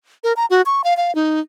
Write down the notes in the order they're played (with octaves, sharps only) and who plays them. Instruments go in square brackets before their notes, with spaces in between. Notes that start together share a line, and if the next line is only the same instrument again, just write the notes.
[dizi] A#4
A#5
F#4
C#6
F5
F5
D#4